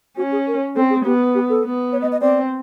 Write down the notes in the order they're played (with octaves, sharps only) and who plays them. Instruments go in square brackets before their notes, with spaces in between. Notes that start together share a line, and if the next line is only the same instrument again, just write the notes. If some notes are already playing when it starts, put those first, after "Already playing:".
[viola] C#4 [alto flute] F#4
[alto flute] G#4
A#4
[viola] C4 [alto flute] A4
[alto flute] G#4
[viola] B3 [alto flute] G4
[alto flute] G4
A4
[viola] B3
[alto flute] C#5
D#5
D#5
[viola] C4 [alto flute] D5